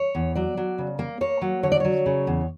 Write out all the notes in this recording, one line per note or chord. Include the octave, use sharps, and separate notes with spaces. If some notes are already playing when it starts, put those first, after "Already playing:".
Already playing: C#5
E2
F#3 D5
F#3
C#3
A#3
A#3 C#5
F#3
D3 C#5
D5
F#3 C#5
C#3
E2